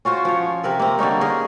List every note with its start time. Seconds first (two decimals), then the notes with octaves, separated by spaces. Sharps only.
0.05 C#4 F4 F#4 C5
0.25 F3 C#5
0.63 C3 A#4 B4 E5
0.79 A#3 C4
0.99 D3 G3 C#4 D#4
1.21 C#4 G#4 A#4 D#5